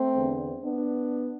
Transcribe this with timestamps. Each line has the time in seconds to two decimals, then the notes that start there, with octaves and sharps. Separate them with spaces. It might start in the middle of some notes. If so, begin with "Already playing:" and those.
Already playing: A3 C4
0.16 E2 D3
0.63 B3 D4